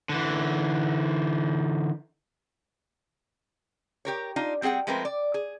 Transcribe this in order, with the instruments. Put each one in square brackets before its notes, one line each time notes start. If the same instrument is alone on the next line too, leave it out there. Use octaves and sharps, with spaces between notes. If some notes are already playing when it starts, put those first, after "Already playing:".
[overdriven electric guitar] D3 E3
[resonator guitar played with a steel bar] G4 A#4 C#5
D4 D#4 F4
G3 C4 G#4 F#5 G5
F3 G#3 A3 C4 A#4 B4
D5
G#4